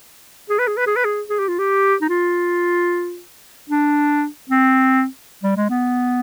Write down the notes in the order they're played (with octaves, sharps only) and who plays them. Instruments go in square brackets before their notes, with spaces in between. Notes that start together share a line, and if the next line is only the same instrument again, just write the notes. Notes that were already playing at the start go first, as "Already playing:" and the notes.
[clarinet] G#4
B4
G#4
B4
G#4
B4
G#4
G#4
G4
F4
G4
D#4
F4
D4
C4
G3
G#3
B3